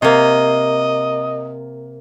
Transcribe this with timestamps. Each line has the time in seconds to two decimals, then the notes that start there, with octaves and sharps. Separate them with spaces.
0.02 C3 A#3 D#5